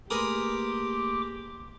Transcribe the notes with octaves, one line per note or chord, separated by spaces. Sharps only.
A3 A#3 G4 G#4 A#4 B4 C6 D6